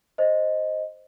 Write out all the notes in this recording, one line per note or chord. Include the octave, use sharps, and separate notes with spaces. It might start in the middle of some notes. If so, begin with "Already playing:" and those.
C5 D#5